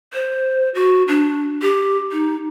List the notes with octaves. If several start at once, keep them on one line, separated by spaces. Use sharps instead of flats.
C5
F#4
D4
G4
D#4